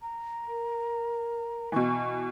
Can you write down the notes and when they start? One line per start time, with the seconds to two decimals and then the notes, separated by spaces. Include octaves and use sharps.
0.01 A#5
0.48 A#4
1.72 B2 E3 C#6